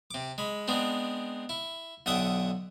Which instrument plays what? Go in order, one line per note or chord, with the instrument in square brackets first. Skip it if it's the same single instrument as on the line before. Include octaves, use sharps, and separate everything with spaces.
[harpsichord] C3 D6
G#3 B5
G#3 B3 C4 D4
E4
B1 D3 E5 F#5 G5 D#6